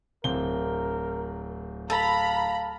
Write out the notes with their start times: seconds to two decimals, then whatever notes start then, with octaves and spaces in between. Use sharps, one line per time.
0.24 D1 C4 A#4 G7
1.90 A4 F5 A#5 B5